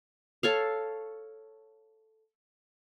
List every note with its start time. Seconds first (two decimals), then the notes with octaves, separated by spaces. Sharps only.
0.43 A4 C#5 F5